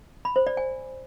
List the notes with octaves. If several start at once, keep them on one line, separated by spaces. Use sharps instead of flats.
B5
C5
D5
G#5